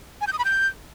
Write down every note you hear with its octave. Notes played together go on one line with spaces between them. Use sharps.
G#5
G6
D#6
B5
G6